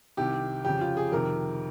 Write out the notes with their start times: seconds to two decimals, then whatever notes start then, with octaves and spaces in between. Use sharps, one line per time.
0.17 C2 C3 D#3 G4
0.65 F2 C#3 G4
0.81 F4
0.97 G#4
1.12 F2 C3 D#3 A#4